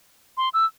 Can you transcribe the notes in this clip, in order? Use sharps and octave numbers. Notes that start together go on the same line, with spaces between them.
C6
E6